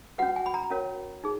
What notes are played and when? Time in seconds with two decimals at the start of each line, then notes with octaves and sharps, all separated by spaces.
0.18 C#4 F#4 B4 F#5
0.36 G#5
0.46 B5
0.54 A#5
0.70 C#4 F#4 A#4 C#5
1.24 D#4 G#4